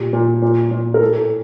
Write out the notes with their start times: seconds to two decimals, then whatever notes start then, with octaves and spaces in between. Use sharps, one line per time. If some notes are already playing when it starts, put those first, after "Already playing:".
Already playing: A#2 G4
0.13 A#2
0.42 A#2
0.71 A#2
0.94 A#4
1.01 A2 A4
1.15 A4